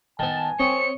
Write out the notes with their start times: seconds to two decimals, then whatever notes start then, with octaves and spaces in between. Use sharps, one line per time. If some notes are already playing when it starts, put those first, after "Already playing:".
0.19 D#3 B3 G#5 A5
0.60 C4 C#5 D#5 C#7